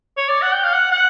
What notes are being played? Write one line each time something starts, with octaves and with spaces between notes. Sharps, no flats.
C#5
D5
F#5
G5
F5
F#5
F#5